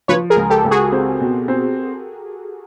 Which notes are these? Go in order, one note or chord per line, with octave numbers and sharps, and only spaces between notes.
F3 B4 C#5
G#4 A#4
C#2
G4 A4
C#2
F#4 G#4
C4
B2
C4